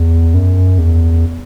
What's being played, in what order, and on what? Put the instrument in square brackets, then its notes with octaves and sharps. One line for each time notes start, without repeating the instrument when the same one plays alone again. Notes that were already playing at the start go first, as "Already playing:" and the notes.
Already playing: [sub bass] E2
F#2
E2